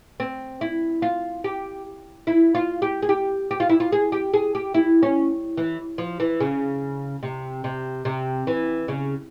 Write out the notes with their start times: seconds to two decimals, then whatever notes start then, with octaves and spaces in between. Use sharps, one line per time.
0.20 C4
0.61 E4
1.02 F4
1.44 G4
2.27 E4
2.55 F4
2.82 G4
3.02 G#4
3.09 G4
3.51 G4
3.60 F4
3.69 E4
3.80 F4
3.92 G#4
4.12 G4
4.34 G#4
4.55 G4
4.74 E4
5.03 C#4
5.57 E3
5.98 F3
6.20 E3
6.40 C#3
7.23 C3
7.64 C3
8.05 C3
8.47 E3
8.88 C#3